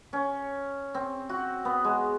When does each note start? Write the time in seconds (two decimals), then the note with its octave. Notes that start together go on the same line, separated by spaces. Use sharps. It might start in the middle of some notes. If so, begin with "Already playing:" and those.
0.13 C#4
0.95 C4
1.29 F#4
1.65 B3
1.84 G#3